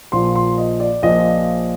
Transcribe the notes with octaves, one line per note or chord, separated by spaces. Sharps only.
A#1 A#2 F3 C6
C6
D#5
D5
A#1 A#2 F3 D#5